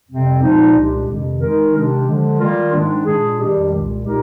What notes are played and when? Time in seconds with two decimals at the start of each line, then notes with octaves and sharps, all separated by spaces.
0.08 F2 C3 G3 C4
0.41 A#2 F3 G#3 D#4
0.75 C2 A#2 G#3 D4 G4
1.07 F2 C3 D#3
1.40 D#3 G#3 D#4 A#4
1.74 C3 D#3 G#3 D4 G4
2.06 D3 F3 G#3
2.39 D#3 G3 A#3 F4 A#4
2.72 G#2 D#3 G#3 D4
3.05 A#2 G#3 D4 G#4
3.39 F2 D#3 G3 D4 G4
3.71 C2 A#2 G#3
4.05 A#2 G#3 D#4 G4 A#4